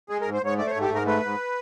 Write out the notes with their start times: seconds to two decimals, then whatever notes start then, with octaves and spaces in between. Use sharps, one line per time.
0.09 G#3 G#4
0.21 A#4
0.26 G#2
0.33 C5
0.42 G#2 C#5
0.58 A3 D5
0.67 C5
0.70 C#5
0.75 G#2
0.82 G4
0.90 G#2
0.95 A#4
1.06 A3 B4
1.23 G#2